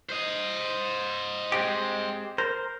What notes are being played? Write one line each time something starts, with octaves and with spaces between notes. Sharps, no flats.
C5 D#5
G#3 C4 G4
A#4 C5